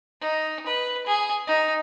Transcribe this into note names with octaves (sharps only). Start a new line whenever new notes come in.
D#4
B4
G#4
D#4